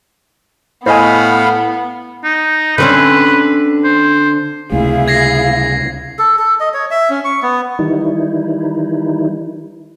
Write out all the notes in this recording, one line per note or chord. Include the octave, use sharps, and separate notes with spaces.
A2 B3 C5 D#5 F5 G#5 B5
D#4
D3 C4 C#4 B4
C5
C#2 C3 A3 E4 G#4 F5
G#6 A#6 C7
A4
A4
D#5
C#5
E5
C#4
C#6
B3
D#3 E3 G3 D#4 E4